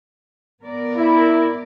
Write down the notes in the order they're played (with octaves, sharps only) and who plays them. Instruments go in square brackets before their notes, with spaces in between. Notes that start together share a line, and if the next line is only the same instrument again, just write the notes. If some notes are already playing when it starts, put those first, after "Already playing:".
[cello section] B3 A#4 D5
[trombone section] E4